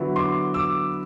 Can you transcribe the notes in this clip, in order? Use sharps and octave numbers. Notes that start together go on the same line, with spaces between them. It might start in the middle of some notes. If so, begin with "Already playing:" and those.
Already playing: D3 F#3 B3 E4
C6 D6
D6 E6